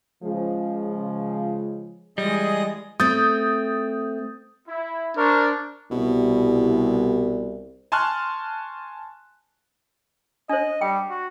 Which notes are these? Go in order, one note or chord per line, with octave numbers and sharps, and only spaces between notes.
C#3 F3 G#3
E3 G3 G#3 G#4 D#5
A3 C4 D#6 G6 A6
E4
D4 A#4 C5 C#6
C2 B2
G#5 A5 C6 C#6 F6 F#6
D4 C5 D#5
G3 G5
F#4